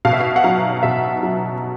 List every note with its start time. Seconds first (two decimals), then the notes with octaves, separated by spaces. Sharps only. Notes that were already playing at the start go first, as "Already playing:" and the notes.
0.05 B2 F5
0.13 E5
0.21 F5
0.36 F#5
0.44 F#3 F5
0.83 B2 E5
1.23 F#3